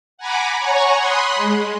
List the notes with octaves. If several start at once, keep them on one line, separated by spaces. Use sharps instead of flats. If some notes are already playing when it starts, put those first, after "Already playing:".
F#5 G#5 A#5 B5 D6
C#5 F#5 G#5 A#5 C#6
B5 C6 D#6 F#6
G#3